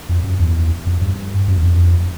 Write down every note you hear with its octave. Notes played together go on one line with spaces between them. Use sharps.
F2
F#2
E2
F2
G2
F#2
E2
F2